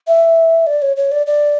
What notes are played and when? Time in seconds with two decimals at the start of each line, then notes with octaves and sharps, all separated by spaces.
0.07 E5
0.67 D5
0.82 C#5
0.97 C#5
1.12 D5
1.27 D5